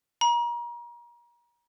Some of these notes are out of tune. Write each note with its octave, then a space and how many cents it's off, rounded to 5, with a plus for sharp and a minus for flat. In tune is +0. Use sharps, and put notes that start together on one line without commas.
A#5 +35